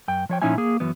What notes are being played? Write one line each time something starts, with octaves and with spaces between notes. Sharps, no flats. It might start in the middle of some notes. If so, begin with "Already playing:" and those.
F#2 G5
F3 C#5 G5
A#2 F3 C#4 D#4 E4 G#5
A#3 G#4
F#2 E3 F#3 B3